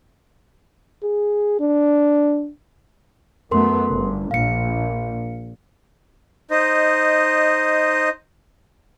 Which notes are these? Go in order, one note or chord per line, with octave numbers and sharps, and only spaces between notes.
G#4
D4
F#2 A3 B3 A#4 C6
G1
A#1 F5 C#7
D#4 C5 D#5